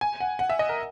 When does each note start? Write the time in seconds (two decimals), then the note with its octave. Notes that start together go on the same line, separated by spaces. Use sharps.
0.01 G#5
0.20 F#5
0.39 F#5
0.50 E5
0.59 D#5
0.69 A#4